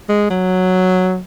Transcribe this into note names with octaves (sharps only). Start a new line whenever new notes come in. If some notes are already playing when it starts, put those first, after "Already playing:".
G#3
F#3